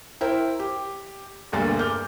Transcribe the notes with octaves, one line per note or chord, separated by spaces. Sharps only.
E4 A#4 C5 G5
G4
E1 D2 G2 A#3 A6
D6 F6 G6